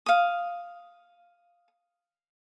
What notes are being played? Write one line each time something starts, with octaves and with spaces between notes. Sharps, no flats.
F5 D#6